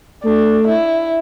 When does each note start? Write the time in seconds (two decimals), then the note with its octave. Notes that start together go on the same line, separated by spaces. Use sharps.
0.24 A3 D4
0.68 E4